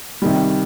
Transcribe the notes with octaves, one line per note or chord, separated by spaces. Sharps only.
C3 D#3 G3